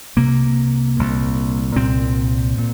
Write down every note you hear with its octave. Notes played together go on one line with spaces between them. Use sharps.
C2 C3 A#3
C2 A#2
C2 A#2 C4
A#2